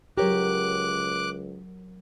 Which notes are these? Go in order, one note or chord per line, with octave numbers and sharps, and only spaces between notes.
C#2 F#3 G4 A#4 C#5 D6 F#6